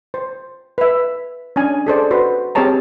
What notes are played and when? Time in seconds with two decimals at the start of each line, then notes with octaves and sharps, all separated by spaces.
0.14 C5
0.78 B4 E5
1.56 C#4 D4 G#5
1.87 G#4 A4 C5 D5
2.11 F#4 B4 C5
2.55 C4 G4 G#4 C#5 A5 A#5